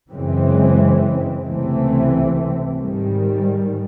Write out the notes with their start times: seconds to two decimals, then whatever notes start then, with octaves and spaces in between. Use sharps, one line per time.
0.11 F#2 C#3 E3 G#3 C4
1.44 C#2 C3 E3 A3 C4
2.78 G#2 D#3 G3